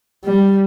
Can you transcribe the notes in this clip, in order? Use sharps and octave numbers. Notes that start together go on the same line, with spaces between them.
G3